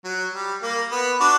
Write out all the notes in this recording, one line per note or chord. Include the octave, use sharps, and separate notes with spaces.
F#3
G3
A#3
B3
D4 F#4